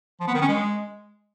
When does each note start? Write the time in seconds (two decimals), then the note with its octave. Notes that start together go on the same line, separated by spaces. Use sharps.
0.21 F3
0.28 B3
0.35 D#3
0.41 C#4
0.48 G#3